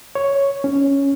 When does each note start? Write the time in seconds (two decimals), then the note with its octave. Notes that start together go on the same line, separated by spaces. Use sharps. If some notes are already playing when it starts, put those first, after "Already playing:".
0.15 C#5
0.64 C#4